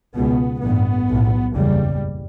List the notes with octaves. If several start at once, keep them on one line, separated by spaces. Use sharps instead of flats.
C#2 B2 B3
A1 G2 B3
B1 A2
F#1 E2 C#3 G3